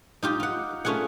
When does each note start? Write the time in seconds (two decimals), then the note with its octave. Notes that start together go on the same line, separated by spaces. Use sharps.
0.23 D#4 F4 G4
0.40 F4 F#5
0.85 A3 C#4 F4 G#4 F#5